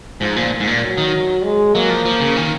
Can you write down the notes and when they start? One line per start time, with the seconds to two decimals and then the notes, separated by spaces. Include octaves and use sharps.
0.21 G#2 F3
0.36 A#2
0.60 G#2
0.67 A#2
0.83 F#3
0.98 D#3
1.44 G#3
1.74 F#3 A#3
1.90 F3
2.05 F3
2.20 C#3
2.36 D#3